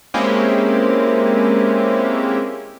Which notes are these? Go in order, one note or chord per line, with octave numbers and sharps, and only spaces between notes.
G#3 A#3 C4 C#4 E4 G4